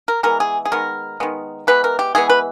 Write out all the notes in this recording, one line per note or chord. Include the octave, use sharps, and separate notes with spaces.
A#4
E3 G#3 B3 A#4
G#4
G#4
D#3 G#3 B3 A#4
D#3 G#3 B3
E3 G#3 B3 B4
A#4
G4
E3 G#3 B3 G#4
B4